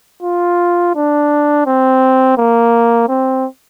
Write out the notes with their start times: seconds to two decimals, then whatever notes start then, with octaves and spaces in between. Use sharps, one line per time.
0.23 F4
0.95 D4
1.66 C4
2.38 A#3
3.09 C4